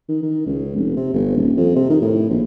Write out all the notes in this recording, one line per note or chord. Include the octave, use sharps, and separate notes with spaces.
D#3
D#3
C#2
F1
C3
G1
D#1
F2
C3
D#3
A2
A#1